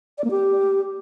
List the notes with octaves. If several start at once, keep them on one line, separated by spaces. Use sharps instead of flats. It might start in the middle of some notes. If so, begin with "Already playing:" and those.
D5
A#3
G4